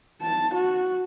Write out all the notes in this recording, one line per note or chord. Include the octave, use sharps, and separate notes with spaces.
A5
F#4